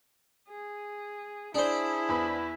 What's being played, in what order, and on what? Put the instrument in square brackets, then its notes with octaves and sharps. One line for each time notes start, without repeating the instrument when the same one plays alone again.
[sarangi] G#4
[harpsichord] D4 C5 [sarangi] E4 [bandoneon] G#4
[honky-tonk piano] E2 B3 B5